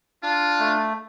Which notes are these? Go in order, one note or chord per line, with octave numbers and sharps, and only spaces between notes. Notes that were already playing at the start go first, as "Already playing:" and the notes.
D4 F4
A3